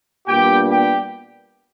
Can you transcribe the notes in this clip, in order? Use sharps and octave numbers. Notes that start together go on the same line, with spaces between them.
A#2 G3 B3 D4 G4 G5
G4 G5